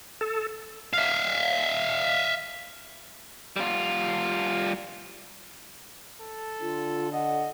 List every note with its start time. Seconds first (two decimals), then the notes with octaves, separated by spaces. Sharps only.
0.21 A4
0.93 E5 F5
3.56 G3 F4
6.22 A4
6.61 D3 F4
7.12 D#5 F#5